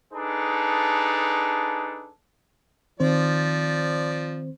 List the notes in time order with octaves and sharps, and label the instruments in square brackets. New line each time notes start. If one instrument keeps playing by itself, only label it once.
[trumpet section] D4 D#4 G#4 A4 B4
[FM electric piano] D#3 C4 C5 [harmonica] F3 D5